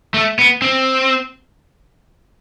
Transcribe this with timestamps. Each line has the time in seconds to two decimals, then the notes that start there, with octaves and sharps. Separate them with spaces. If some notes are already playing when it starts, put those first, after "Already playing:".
0.14 A3
0.39 B3
0.62 C4